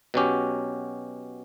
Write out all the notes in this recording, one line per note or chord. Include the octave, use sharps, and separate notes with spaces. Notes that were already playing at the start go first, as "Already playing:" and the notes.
B2 F#3 C#4 G4